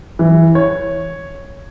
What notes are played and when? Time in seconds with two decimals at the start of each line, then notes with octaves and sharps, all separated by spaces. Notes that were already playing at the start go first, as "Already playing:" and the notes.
0.19 E3
0.55 C#5